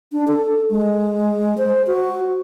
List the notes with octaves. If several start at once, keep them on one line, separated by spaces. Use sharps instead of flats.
D4
A4
G#3
C5
F#4